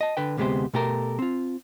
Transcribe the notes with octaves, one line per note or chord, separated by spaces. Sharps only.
D#5 A5
D3 B4 G5
D2 C3 G#3 B3 G4 C5
B2 A3 G4 A4 A#4
C4 F4